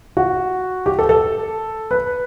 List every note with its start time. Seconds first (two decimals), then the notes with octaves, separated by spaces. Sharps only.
0.17 F#4
0.86 G4
0.99 A4
1.09 A4
1.91 B4